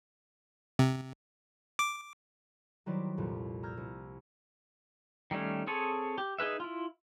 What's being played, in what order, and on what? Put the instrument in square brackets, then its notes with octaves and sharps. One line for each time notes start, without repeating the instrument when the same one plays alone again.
[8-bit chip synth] C3
D6
[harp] D#3 F#3 G3 E4 C5 D5
C2 F2 A#2
A#5 E6 F6 G6 G#6
C2
[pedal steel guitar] D#3 G3 A3 C#4
C4 G#4 A4 C#5 G#5
G4
D#4 G#4 B4 E5
E4 F4